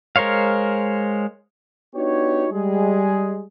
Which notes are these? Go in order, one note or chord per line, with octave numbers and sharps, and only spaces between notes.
G#3 A#4 C5 C#5 F5
B3 D4 D#4 F#4 G4 C#5
G3 G#3 G#4